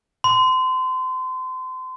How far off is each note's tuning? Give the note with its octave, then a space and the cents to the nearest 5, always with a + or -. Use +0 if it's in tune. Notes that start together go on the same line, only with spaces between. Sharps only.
C6 -30